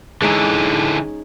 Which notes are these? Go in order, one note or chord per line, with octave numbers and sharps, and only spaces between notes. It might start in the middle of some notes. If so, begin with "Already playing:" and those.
D3 E3 G#3 C#4 D#4